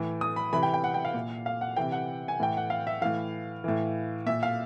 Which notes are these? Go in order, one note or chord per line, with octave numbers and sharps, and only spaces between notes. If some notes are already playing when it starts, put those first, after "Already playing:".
Already playing: A2 E3
D#6
B5
C3 E3 B5
G5
G5
F#5
G5
F5
A#2
F5
F#5
C3 E3 G5
F#5
G#5
A2 E3 G5
F#5
F5
E5
A2 E3 F5
A2 E3
A#2 E5
F5